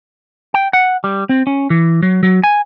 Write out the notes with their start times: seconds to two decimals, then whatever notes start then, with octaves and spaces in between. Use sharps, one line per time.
0.54 G5
0.73 F#5
1.04 G3
1.29 C4
1.47 C#4
1.70 E3
2.03 F#3
2.23 F#3
2.44 G#5